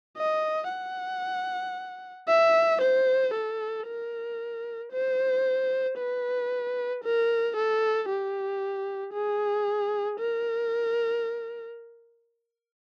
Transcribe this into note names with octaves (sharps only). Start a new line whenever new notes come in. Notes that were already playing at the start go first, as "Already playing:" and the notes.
D#5
F#5
E5
C5
A4
A#4
C5
B4
A#4
A4
G4
G#4
A#4